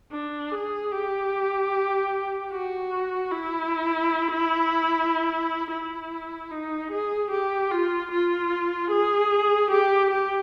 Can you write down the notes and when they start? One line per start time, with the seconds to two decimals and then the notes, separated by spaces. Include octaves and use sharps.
0.12 D4
0.52 G#4
0.92 G4
2.52 F#4
3.32 E4
5.71 E4
6.51 D#4
6.92 G#4
7.31 G4
7.71 F4
8.12 F4
8.91 G#4
9.71 G4
10.11 G4